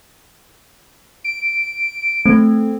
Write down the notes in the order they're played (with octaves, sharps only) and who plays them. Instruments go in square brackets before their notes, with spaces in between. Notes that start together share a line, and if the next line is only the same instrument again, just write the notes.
[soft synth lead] D7
[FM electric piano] A3 [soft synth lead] C4